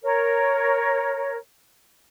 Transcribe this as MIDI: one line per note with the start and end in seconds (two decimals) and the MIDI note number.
0.03 1.36 70
0.03 1.36 73